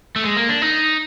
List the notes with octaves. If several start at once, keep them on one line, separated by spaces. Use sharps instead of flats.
A3
G#3
A#3
D4
D#4